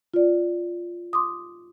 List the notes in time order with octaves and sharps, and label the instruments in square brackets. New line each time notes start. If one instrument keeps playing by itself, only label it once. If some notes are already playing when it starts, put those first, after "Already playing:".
[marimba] F4 D5
C6 D6 D#6